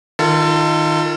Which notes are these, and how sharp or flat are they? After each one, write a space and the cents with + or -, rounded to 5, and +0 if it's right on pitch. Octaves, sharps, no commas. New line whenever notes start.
D#3 +0 F4 -15 A4 +30